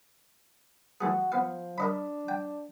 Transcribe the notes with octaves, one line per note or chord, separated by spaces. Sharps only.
E3 A3 F#4 G#4
F3 B3 F5
D4 A#4 D#5 B5
G5